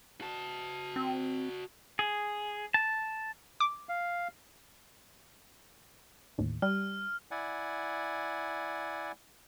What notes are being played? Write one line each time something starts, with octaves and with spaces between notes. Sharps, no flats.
F#4 A5
C4
G#4
A5
D6
F5
A1 D#2
G3 F6
E4 D5 F#5 G#5